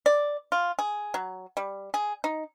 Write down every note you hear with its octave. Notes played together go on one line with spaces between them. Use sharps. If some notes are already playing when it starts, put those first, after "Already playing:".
D5
F4
G#4
F#3
G3
G#4
D#4